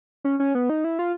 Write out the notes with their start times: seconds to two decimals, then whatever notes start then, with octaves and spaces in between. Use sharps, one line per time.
0.24 C#4
0.40 C#4
0.55 B3
0.70 D#4
0.84 E4
0.99 F4